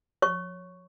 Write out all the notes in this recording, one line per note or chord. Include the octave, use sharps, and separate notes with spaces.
C#5 C#6